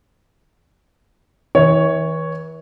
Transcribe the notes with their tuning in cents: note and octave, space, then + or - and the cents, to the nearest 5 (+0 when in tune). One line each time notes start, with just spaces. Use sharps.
E3 -35 C#5 +0